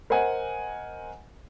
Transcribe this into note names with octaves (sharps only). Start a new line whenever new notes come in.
A#4 C5 D#5 F#5 G#5